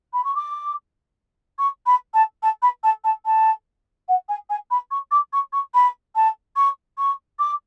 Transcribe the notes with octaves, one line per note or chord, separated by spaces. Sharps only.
B5
C#6
D6
C#6
B5
A5
A5
B5
A5
A5
A5
F#5
G#5
G#5
B5
C#6
D6
C#6
C#6
B5
A5
C#6
C#6
D6